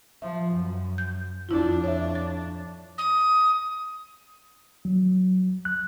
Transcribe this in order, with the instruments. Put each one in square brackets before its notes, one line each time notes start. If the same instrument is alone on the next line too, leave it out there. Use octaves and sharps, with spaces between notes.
[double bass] F3 [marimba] E5
[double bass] F#2
[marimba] G6
[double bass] F2 D4 [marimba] E4 F4
[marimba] C#5 E5
A6
[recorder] D#6
[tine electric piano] F#3
F#6